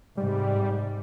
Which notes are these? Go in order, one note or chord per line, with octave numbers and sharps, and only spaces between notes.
G#2 C3 G3